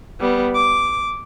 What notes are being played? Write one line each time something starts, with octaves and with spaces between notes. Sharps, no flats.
G3 B3
D6